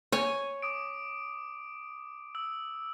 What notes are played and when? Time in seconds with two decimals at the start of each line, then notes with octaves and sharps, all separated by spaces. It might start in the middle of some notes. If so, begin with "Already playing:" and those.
0.12 C#5 G#5
0.62 D6 D#6 D7
2.35 E6